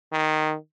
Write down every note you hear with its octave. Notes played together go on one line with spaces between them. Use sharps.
D#3